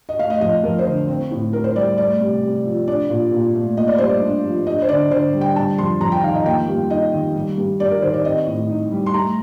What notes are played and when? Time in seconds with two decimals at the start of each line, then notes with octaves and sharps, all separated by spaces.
0.09 D#5
0.19 A3 F5
0.30 D#5
0.41 F2 D#5
0.64 F2 A#4
0.79 C5
0.86 D3
1.08 C4
1.31 A2
1.53 A2 A#4
1.64 C5
1.75 G3 D5
1.98 A3 D5
2.20 C3
2.42 C3
2.65 F3
2.87 D4 D5
3.10 A#2
3.32 A#2
3.55 A3
3.77 A#3 D#5
3.88 D5
3.98 G2 C5
4.09 D5
4.22 D4
4.44 F3
4.67 D4 D#5
4.82 C5
4.89 D3 D5
5.11 D3 C5
5.33 G3
5.41 G5
5.56 G3 A5
5.78 F2 C6
6.00 F2 A#5
6.12 G5
6.23 D#3 F5
6.35 D#5
6.45 A#3 G5
6.68 G2
6.90 D#4 D#5
7.13 D#3
7.35 G3
7.58 G2
7.80 G2 D5
7.91 A#4
8.02 D#3 C5
8.14 D5
8.25 C4 D#5
8.47 A2
8.70 D#4
8.92 G3
9.06 C6
9.14 A3 A#5